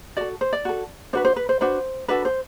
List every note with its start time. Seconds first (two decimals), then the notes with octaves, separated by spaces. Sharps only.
0.17 F#4 A4 D5
0.41 C5
0.53 D5
0.65 F#4 A4
1.13 D4 F#4 B4 C5
1.25 C5
1.36 B4
1.49 C5
1.61 D4 F#4 B4 C5
2.08 D4 F#4 A4 B4
2.25 C5